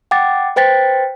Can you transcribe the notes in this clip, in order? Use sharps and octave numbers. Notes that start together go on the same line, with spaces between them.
F#5 G5 D6 A6
B4 C5 G5 A6 B6